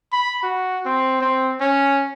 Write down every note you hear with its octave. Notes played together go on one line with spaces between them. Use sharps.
B5
F#4
C4
C4
C#4